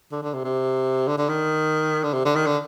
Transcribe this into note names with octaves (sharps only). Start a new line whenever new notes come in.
D3
D3
C3
C3
D3
D3
D#3
D3
C3
D3
D#3
D3